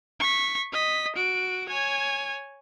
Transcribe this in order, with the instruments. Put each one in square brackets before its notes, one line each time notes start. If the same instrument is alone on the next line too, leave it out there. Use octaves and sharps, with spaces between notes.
[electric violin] C#6 B6
D#5 B6
F#4 D7
C#5 G#5